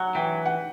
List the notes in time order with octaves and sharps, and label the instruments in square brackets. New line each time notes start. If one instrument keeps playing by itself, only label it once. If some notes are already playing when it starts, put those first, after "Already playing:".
Already playing: [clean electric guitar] F#3 [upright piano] F#5
[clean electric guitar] E3 [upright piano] G5
[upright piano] F#5